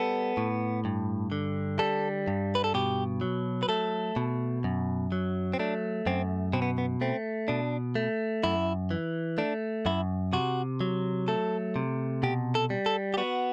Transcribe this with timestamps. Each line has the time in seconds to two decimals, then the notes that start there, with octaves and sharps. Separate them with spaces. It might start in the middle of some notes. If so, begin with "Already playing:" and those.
Already playing: G3 B3 A4
0.37 A2
0.85 G2
1.32 D3
1.79 G3 A4
2.28 G2
2.55 B4
2.64 A4
2.74 B2 G4
3.21 F#3
3.63 B4
3.69 A3 A4
4.16 B2
4.64 F#2
5.12 F#3
5.53 C4
5.59 A3 D4
6.06 F#2 C4
6.53 B2 C4
6.62 B3
6.78 B3
7.01 A3 C4
7.48 B2 D4
7.95 A3
8.43 F#2 E4
8.91 E3
9.38 A3 D4
9.86 F#2 E4
10.33 C3 F#4
10.81 F#3
11.28 A3 A4
11.76 C3
12.23 B2 G4
12.55 A4
12.70 G3
12.86 A4
13.14 G4
13.17 B3 F#4